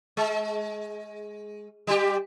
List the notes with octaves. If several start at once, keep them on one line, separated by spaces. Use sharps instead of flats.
G#3
G3 G4